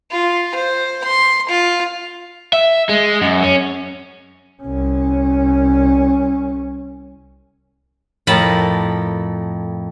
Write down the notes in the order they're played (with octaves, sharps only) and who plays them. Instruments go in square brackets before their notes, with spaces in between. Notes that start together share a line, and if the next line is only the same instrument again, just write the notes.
[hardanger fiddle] F4
C5
C6
F4
[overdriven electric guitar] E5
G#3
F#2
C#4
[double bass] C2 C#4
[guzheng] F2 A2 A#4 A5 B5